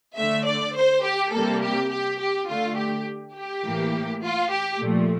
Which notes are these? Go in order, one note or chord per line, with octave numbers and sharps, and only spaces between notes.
D3 A3 E5
D5
C5
G4
C3 G3 A#3 A4
G4
G4
G4
D3 A3 F4
G4
G4
A2 E3 A#3
F4
G4
A#2 F3 A3